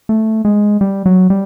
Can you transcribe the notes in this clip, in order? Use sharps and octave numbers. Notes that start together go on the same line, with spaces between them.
A3
G#3
G3
F#3
G3